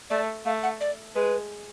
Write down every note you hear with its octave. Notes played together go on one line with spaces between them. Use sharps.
A3 D5
A3 F5
F#5
D5
G#3 B4